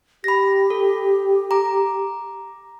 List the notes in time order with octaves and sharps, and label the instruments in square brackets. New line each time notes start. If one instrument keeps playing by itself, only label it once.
[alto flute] G4 [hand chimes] B5 A#6
[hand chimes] A4
A#5 D6